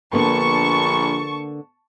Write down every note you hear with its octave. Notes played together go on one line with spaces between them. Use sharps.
A#1 D3 A#3 B3 A5 C#6